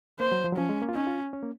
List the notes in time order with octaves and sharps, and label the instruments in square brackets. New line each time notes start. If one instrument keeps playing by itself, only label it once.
[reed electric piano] A#3 [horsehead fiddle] C5
[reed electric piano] F#3
F3
F#3
[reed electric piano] F3 [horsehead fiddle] C#4
[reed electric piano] G#3
A#3
F4
[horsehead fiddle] C#4 [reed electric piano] D#4
[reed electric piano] F4
C#4
A#3